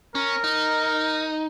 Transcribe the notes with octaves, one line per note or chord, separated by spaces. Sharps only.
C#4 A#4
D#4